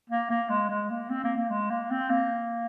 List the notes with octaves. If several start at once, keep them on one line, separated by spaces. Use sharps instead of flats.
A#3
A#3
G#3
G#3
A#3
C4
A#3
A#3
G#3
A#3
C4
A#3